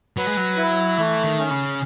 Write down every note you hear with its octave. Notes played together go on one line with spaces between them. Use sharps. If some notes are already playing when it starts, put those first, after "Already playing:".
F#3 B4
G#3
F#3
E4
E3 A3
D#3
C#4
C#3